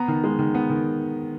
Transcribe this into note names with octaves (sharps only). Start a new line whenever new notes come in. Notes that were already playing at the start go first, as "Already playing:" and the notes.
Already playing: B3 A#5
D#3
G#3
D#3
B3
D#3